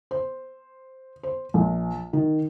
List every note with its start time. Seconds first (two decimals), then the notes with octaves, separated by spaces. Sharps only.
0.11 C5
1.23 C5
1.54 A#1
2.13 D#3